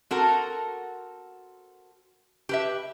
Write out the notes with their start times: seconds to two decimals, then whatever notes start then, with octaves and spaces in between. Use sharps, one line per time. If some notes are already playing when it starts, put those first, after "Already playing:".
0.11 C4 F#4 A4 A#4
2.49 G4 B4 E5